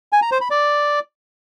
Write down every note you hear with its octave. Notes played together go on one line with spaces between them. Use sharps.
G#5
A#5
C5
B5
D5